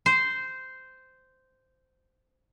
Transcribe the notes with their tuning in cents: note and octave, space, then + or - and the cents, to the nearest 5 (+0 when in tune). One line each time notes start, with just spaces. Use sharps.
C5 -10